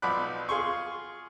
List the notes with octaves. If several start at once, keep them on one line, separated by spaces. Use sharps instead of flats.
B1 F3 D5 B5 F#6
F4 G#4 C6 C#6